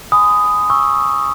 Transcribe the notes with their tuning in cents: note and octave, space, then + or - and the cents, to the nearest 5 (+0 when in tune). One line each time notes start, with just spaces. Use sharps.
G#5 +0 B5 +35 D#6 +0
G#5 +0 C#6 +0 E6 +0